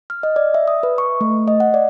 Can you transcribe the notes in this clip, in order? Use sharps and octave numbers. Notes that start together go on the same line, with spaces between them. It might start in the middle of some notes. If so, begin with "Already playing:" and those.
F6
D#5
D5
E5
D#6
B4
C#6
A3
D#5
F#5
D5